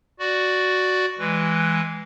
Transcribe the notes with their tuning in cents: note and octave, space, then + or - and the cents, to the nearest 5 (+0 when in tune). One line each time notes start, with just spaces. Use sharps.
F#4 +0 D5 +0
E3 +0 G#3 +0 B4 +0